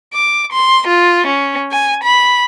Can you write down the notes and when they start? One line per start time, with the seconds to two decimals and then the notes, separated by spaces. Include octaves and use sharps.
0.14 D6
0.52 C6
0.87 F4
1.27 C#4
1.72 G#5
2.03 B5